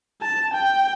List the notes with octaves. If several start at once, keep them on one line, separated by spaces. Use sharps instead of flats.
A5
G5